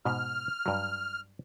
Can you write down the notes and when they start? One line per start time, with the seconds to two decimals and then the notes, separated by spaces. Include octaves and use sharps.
0.05 G#2 B2 F6
0.66 G2 F#3